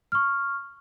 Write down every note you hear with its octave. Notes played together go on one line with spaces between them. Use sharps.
C#6 F6